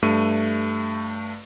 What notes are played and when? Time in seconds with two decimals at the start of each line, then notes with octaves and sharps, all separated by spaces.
0.02 G2 A3 C#6 D#7